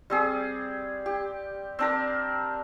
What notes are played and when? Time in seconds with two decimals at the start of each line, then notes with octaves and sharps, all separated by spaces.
0.10 G3 C4 G#4
1.06 G4
1.79 C4 D4 A#4